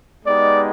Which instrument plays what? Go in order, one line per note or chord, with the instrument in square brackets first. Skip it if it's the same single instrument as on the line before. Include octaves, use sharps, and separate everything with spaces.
[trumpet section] G#3 B3 D#4 G4 D5